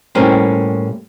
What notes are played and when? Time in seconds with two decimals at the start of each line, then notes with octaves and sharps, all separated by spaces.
0.15 A2 G3 A#3 C4 C#4